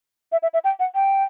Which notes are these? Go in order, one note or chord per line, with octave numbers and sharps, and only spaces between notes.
E5
E5
E5
G5
F#5
G5